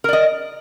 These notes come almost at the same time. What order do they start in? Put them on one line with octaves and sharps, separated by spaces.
A#4 D5 D#5